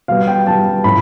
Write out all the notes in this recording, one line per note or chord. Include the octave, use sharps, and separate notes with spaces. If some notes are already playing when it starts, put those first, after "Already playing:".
B2 G3 B3 F5
G5
B2 G3 B3 A5
A2 F3 A3 B5